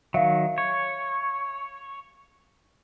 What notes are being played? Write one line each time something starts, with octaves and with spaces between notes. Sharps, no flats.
D#3 F#3 E5 F5
C#5